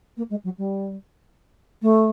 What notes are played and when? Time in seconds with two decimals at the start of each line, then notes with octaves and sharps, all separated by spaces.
0.17 A#3
0.30 G#3
0.44 F#3
0.58 G3
1.82 A3